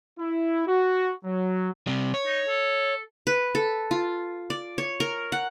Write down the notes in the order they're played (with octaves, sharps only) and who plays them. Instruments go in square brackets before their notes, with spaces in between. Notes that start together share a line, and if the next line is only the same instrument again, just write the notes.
[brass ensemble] E4
F#4
F#3
[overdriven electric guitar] C3 G3
C#5
[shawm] D#4
A4
[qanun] B4
A4
F4
D5
C#5
A#4
F#5